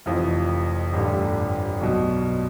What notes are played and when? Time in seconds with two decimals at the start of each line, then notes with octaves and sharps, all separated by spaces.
0.06 F1 F2 E3 F4
0.93 A1 G2 D3 G4
1.81 B1 B2